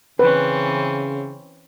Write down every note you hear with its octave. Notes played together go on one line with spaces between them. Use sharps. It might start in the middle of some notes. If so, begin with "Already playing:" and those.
C#3 E3 C4 C#4 B4